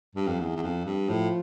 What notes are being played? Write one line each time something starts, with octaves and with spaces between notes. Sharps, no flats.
G2
F2
E2
E2
F2
G2
A2 F3